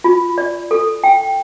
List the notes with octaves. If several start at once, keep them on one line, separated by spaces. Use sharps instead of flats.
F4
D5
A4
G5